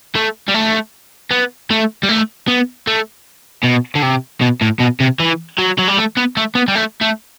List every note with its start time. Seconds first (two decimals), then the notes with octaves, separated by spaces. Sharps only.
0.15 A3
0.48 G3
0.54 A3
1.31 B3
1.70 A3
2.03 G3
2.09 A3
2.48 B3
2.87 A3
3.64 B2
3.95 D3
4.03 C3
4.41 B2
4.62 A2
4.80 B2
5.01 C3
5.20 E3
5.58 F#3
5.79 F#3
5.88 G3
5.98 A3
6.17 B3
6.37 A3
6.55 B3
6.68 G3
6.75 A3
7.01 A3